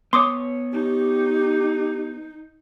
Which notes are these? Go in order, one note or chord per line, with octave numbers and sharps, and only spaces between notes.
B3 C#5 C6 D6 D#6
D#4 G4